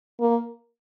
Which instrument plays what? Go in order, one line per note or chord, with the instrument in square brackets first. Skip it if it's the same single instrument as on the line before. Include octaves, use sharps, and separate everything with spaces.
[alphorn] A#3